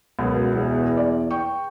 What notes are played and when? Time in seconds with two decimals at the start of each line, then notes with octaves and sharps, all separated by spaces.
0.19 C#2 F#2 B2
0.53 E2
0.97 D5
1.31 G5 C#6